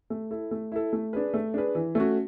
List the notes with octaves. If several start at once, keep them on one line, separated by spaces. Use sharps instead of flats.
A3
E4 A4
A3
E4 A4
A3
D4 G#4 B4
A3
D4 G#4 B4
E3
A3 C#4 F#4